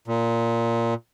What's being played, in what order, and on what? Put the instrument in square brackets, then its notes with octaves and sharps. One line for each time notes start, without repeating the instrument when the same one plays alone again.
[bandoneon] A#2